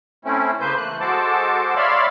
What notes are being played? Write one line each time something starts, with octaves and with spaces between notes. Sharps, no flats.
A3 C4 C#4 E4
C#3 A#3 B4 C5 G6
E3 A3 F#6
G#3 F#4 A4 C5 A5 D6
C#5 D5 E5 F5 B5 C6